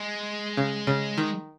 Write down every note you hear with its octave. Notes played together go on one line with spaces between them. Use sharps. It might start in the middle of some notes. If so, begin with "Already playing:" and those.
Already playing: G#3
C#3
C#3
D#3